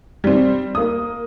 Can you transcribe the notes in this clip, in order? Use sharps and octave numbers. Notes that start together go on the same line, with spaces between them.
G3 C4
A#3 D#6